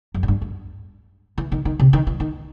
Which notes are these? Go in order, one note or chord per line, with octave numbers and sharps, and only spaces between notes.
F#2
A2
G2
F#2
E3
D#3
D#3
C3
D#3
E3
D#3